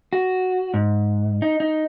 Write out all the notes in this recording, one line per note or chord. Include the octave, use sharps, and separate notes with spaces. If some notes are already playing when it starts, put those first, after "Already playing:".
F#4
G#2
D#4
D#4